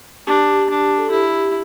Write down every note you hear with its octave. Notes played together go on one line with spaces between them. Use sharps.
D4 G4
D4
A4
E4 G4